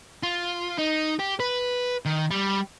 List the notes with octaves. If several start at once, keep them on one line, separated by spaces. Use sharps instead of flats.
F4
D#4
G4
B4
D#3
G3